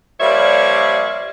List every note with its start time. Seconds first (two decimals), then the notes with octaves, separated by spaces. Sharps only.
0.20 F3 G3 A#3 C#5 D5 E5